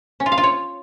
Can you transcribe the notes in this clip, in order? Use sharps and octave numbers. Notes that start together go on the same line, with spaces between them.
C#4
F4
F5
F4
C#5